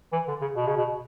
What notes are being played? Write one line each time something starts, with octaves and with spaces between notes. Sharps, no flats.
E3
D3
C#3
B2
C#3
B2